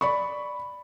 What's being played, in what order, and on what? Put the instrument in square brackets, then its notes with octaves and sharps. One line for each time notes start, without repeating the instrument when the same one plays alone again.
[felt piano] D5 B5 C#6